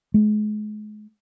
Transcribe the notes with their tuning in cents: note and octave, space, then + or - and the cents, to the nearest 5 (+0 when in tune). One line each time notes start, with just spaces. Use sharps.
G#3 +35